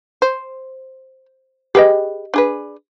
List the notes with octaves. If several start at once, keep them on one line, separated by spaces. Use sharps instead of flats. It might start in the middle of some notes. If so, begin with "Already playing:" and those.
C5
G4 G#4 B4 D#5 G5
D4 G#4 B4